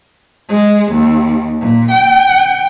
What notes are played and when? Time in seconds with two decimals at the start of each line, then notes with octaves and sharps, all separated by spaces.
0.49 G#3
0.92 D#2
1.61 A#2
1.91 G5